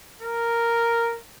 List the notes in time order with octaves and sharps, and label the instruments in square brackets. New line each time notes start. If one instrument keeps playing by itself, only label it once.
[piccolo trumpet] A#4